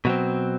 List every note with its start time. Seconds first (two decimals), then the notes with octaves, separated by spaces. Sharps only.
0.05 B2 F#3 C4